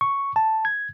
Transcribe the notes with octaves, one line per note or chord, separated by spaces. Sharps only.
C#6
A5
G#6